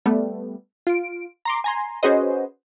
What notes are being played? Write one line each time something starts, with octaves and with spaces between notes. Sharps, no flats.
G3 A3 B3
F4 D7
A#5 C6 D6
G#5 A#5 C6
C#4 F#4 G#4 B4 C5 D#5